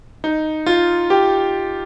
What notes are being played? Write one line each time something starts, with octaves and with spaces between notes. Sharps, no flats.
D#4
F4
G4